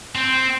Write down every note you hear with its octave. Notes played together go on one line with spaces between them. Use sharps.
C4